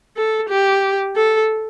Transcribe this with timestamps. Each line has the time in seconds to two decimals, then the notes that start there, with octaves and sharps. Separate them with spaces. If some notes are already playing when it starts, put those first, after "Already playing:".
0.16 A4
0.49 G4
1.16 A4